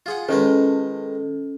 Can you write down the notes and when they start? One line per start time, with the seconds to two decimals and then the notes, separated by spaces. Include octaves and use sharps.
0.06 F4 G#4 F#5
0.29 D#3 G#3 C#4 A4 B4